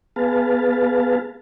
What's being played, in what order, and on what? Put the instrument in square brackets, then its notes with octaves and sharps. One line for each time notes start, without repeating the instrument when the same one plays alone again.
[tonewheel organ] B3 G#4 B4 F5 A5